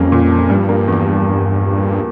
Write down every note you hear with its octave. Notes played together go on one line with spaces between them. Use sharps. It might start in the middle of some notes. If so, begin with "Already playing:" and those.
Already playing: F2 G3 A#3 C#4
A#2
F3
G2 G3
A#3
E2